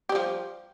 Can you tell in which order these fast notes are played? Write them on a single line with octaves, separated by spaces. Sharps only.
G4 G3 F3